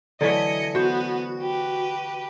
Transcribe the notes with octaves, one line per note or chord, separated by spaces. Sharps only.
D3 E3 F#3 A3 D#5 G#6 B6 C#7
B3 F#4 C5
G4 B4